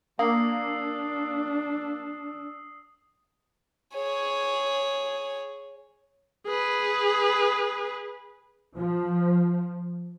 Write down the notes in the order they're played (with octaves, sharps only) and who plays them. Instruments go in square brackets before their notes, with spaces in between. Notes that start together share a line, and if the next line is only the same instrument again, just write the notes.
[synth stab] A#3 [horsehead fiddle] D4 [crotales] D#6 E6 C7
[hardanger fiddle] G#4 C#5
[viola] G#4 B4
[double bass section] F3